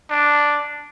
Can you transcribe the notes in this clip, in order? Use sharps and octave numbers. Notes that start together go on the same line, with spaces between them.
D4